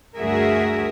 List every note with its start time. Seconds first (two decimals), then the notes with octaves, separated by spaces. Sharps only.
0.17 D2 G2 F#4 G#4 A#4 E5